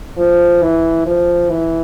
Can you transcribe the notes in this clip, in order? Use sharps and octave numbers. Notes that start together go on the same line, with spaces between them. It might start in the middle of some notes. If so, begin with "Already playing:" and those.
F3
E3
F3
E3